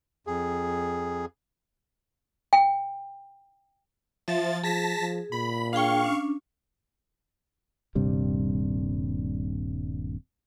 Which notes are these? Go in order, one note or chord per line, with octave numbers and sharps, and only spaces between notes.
F2 G#4
G5
F3 E5 A6
F3 G#4 A5 A#6 B6
F3
A#2 B5
D4 G#4 F5 G5 C#6
C#4 D4
D#1 G2 C3 G3